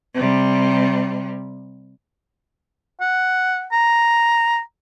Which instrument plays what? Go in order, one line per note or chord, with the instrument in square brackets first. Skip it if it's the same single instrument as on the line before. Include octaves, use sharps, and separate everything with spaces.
[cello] C3 G3
[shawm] F#5
A#5